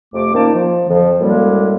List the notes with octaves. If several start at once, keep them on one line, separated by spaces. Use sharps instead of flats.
F2 C3 A3 D6
A#2 D#3 A#3 C#4 D#4 A5
F3
F2 D3 F3
F#2 A2 G3 G#3 A#3